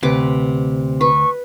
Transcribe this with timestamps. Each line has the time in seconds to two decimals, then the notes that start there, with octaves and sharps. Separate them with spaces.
0.03 D2 C3 B4 D6
1.01 B4 C#6